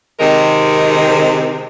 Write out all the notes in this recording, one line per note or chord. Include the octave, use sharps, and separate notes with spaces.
C3 D#3 G#3 C4 A#4